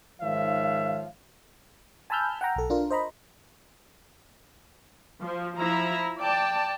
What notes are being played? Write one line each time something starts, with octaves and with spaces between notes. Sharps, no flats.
G#2 D#3 F3 C#5 E5 F5
G#5 A5 B5 E6 F6 G6
F#5 G5 A#5
B1 A4
D4 F4 A#4
C5 D#5 A#5 B5
F3
F3 E4 A#5
D5 G5 A5